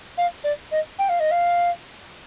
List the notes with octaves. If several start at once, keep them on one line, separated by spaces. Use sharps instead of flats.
F5
D5
D#5
G5
F5
D#5
F5